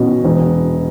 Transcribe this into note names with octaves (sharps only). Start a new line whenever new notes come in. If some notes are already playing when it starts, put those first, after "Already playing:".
Already playing: B2 C#4
E1